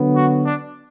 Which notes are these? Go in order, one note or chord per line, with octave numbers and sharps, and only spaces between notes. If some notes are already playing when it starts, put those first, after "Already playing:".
Already playing: D3 F#3 B3
F#4
D4